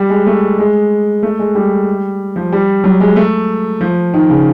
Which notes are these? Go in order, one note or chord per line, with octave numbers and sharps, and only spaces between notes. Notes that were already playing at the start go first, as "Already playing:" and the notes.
Already playing: G3
G#3
A3
G#3
A3
G#3
G3
F3
G3
F#3
G#3
A3
F3
D#3
C#3